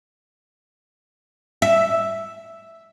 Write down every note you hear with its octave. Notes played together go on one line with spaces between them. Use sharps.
E5